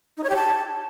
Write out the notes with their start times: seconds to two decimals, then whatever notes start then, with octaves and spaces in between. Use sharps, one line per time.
0.17 D#4
0.24 C#5
0.30 G4
0.36 A5